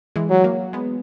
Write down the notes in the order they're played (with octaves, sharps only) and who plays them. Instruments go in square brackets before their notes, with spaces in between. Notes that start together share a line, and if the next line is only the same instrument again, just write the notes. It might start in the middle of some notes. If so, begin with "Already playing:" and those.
[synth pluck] E3 G#3
[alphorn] F#3
[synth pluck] F#3 A#3
G#3 B3